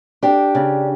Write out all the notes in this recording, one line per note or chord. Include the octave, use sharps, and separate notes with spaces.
D4 G4
C#3